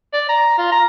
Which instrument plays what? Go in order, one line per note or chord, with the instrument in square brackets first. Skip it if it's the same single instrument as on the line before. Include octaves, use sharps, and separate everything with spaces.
[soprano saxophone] D5
A#5
F4
A#5